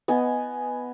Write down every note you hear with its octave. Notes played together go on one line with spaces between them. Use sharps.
B3 D#5 G#5